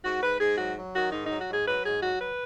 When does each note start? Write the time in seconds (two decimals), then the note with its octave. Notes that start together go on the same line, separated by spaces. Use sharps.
0.04 G#2 F#4
0.23 G#2 B4
0.40 G#2 G#4
0.58 F#3 F#4
0.76 F#3
0.95 D#3 F#4
1.12 G#2 D#4
1.27 F#3 D#4
1.40 F#4
1.50 G#2 G#4
1.67 F#3 B4
1.85 G#2 G#4
2.03 F#3 F#4
2.21 B4